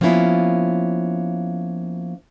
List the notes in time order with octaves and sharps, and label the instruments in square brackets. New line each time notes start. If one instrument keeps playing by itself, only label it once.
[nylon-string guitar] F3 A#3 B3 C#4 E4 F4